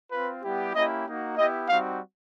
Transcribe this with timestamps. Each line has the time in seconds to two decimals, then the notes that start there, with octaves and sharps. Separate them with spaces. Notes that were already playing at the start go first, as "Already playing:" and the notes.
0.12 C4 F4 B4
0.43 G3 B3 E4 G4
0.74 A#3 C#4 E4 G4 D#5
1.06 A#3 D#4 F#4
1.37 B3 E4 G4 D#5
1.69 G3 C4 D#4 F#4 F5